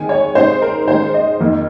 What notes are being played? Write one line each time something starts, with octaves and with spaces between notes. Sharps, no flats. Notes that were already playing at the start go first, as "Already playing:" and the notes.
Already playing: D#3 G#3 C4 D#4 G#5
C#5
C#3 G#3 C4 D#4 C5
A#4
D#3 G#3 C#4 C5
D#5
F2 D#3 A#3 D#4